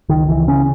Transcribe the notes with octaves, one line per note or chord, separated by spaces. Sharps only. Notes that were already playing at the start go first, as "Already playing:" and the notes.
C#2 D#3
C#2 E3
C#3 C#4